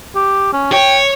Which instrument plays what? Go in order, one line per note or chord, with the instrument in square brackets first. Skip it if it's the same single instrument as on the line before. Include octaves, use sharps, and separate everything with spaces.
[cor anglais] G4
C#4
[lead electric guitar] C#5 [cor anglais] G5